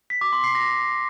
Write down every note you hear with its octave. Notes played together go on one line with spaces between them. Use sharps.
B6
D6
C6
C7
A#6